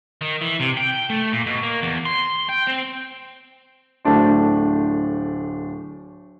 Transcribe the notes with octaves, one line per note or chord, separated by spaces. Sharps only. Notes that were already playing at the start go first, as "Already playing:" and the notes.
D#3
E3
C3
G5
A3
A#2
B2
A#3
E2
C6
G5
C4
D1 A3 D4 C5